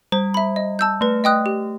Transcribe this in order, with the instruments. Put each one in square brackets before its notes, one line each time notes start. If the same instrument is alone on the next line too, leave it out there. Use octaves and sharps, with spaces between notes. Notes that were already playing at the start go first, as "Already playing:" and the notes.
[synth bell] G3 [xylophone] C5
[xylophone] E5 B5
D#5
A5 E6 G6
[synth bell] A3 [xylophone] B4
[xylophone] D#5 G5 D#6 F#6
G4